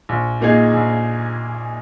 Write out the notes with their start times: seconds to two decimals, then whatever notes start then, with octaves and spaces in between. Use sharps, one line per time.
0.09 A#1
0.41 A#2 A#3 D#4 G#4
0.74 A#1